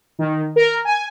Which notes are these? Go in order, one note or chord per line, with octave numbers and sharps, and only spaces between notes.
D#3
A#4
G#5